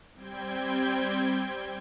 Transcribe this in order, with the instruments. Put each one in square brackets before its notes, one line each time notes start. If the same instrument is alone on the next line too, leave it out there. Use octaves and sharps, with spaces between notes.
[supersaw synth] G3 C4 G5 G#6